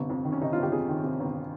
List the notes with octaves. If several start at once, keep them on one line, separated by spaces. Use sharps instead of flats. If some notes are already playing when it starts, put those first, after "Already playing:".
Already playing: G1 C3
F2
D#3
C#4
C3 D#4
G1 F4
G4
F2 G#4
D#3
C3
G1